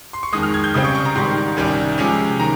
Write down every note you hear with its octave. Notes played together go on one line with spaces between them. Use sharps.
C6
C#6
F2 D#3 G#3 D#6
F6
G#6
G6
C#2 C#3 G3 C4 D#6
C#6
C#6
A#5
G#2 D#3 G3 C6
C2 C3 D#3 G3 C#4
C3 F3 G#3 C#4
D#3 A#5